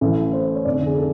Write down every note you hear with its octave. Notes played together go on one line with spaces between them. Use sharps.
A1 A2 E3
C5
C#5
F1 F2 D3 D5
G#4
A4